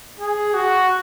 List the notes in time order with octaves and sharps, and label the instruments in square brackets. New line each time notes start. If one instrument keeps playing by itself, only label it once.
[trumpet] G#4
F#4